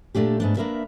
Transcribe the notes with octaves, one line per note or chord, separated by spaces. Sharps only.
A#2 A3 D4 G4
G#2 B3 D4
A#3 D4 A#4 B4 E5